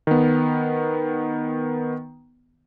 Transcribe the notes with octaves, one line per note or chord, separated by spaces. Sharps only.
D#3 B3